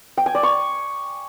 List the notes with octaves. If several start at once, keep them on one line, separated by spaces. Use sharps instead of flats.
G5
G#5
D5
C#6